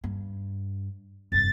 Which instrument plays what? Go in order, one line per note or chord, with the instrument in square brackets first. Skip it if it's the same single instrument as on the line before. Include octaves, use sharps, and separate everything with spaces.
[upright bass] G2
[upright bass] F1 G2 [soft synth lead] A6